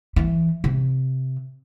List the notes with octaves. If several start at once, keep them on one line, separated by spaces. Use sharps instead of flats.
E3
C3